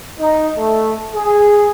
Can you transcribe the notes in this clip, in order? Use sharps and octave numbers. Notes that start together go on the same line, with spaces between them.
D#4
A3
G#4